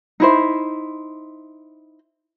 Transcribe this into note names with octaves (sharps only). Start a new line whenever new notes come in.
D#4 E4 C5